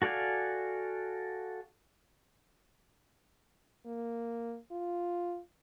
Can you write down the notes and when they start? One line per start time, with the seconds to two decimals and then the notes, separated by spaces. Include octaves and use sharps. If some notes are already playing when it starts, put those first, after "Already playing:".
0.02 F#4 A4 D5 F5 G#5
3.86 A#3
4.71 F4